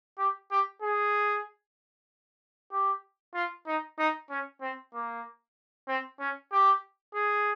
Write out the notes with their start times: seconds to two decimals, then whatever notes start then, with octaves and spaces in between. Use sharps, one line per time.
0.18 G4
0.51 G4
0.82 G#4
2.72 G4
3.34 F4
3.67 D#4
3.98 D#4
4.30 C#4
4.61 C4
4.93 A#3
5.88 C4
6.20 C#4
6.52 G4
7.14 G#4